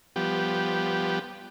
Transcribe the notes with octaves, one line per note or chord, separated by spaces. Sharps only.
F3 G3 B3 G4